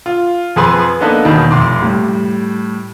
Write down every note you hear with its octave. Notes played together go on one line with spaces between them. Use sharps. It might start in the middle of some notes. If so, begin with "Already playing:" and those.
F4
F2 F3 G#4 B4 C6
A#3 B3 D4 D#4 A4 B4
E1 E2 B2 D#3
F1 C6 D6
A2 G3